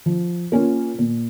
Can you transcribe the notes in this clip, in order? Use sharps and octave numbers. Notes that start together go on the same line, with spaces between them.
F3
A#3 C#4 F4
A#2